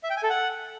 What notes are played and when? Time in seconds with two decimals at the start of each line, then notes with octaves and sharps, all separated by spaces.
0.03 E5
0.10 G5
0.17 G#5
0.23 A4
0.30 F#5